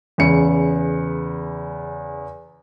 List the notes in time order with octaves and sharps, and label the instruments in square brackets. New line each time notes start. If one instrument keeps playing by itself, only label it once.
[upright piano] E2 C#3 C#7